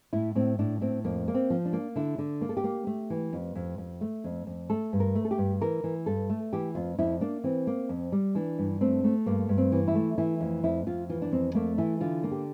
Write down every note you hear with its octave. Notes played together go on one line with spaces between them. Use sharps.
A2 E4
A2 C4
A2 D4
A2 C4
F2 A#3
A#3
C4
F3
D4
A#3
D3 E4
D3
A#3
A4
G4
A#3
A3
E3
F2
F2
F2
A3
F2
F2
A3 A4
G2
A#4
A3
A4
G4
G2
E3 A#4
E3
G2 A4
A3
E3 G4
F2 F4
F2 E4
A#3 D4
E3 C4
A#3
F2
G3
E3 D4
G2
A3 C4
A3
G2 A#3
G2
C4
E3
E4
A3
E3 E4
F2
F2 E4
F2 F4
E3 F4
D4
F2 C4
A3 A#3
E3 E4
D3 F4
A#3
G4